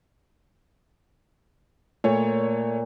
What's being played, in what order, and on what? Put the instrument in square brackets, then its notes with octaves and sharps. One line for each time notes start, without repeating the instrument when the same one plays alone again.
[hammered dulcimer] A#2 [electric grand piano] A3 C#5